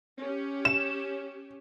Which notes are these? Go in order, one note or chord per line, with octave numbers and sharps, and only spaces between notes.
C#4 G4
E7